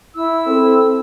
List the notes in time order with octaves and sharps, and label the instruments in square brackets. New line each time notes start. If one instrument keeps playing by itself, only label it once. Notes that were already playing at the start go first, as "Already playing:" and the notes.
[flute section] E4 E6
[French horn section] C4 A4